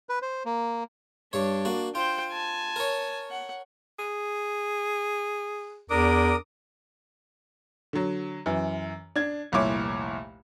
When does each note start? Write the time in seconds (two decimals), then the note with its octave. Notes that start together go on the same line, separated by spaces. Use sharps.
0.09 B4
0.22 C5
0.46 A#3
1.33 G2 D4 C#5
1.65 A#3 F#4
1.95 F4 C5 G5
2.32 G#5 A5
2.76 A#4 C#5
3.31 F#5
3.99 G#4
5.90 E2 D4 A#4 D6 D#6
7.93 D3 F#3
8.46 F#2 E3
9.16 D4 G#6
9.52 F1 C2 A#2 E4 C#5 D6